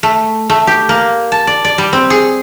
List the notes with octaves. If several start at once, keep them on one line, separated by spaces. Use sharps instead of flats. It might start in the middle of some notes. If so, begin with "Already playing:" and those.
A3
A3
G4
A#3
A5
D5
D5
G3
C4
G#4